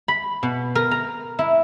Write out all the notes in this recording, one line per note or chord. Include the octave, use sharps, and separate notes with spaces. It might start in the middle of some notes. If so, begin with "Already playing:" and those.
B5
B2
A#4
A#5
E4